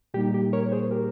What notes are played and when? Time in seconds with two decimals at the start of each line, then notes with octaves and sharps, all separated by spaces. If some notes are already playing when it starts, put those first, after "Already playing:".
0.14 A#2 G3 A#3 D#4 G4
0.34 G4
0.53 A#4 C#5
0.72 G#4 C5
0.91 G4 A#4